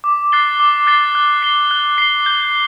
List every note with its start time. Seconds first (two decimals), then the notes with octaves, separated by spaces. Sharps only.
0.04 D6
0.32 F#6 A6 C7 G7
0.60 D6
0.87 F#6 A6 C7 G7
1.15 F#6
1.43 C7 G7
1.71 F#6
1.98 C7 G7
2.26 G6